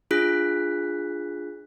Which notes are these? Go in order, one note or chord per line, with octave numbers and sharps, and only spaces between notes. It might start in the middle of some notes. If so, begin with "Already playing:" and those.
D4 F4 G#4 F#6 B6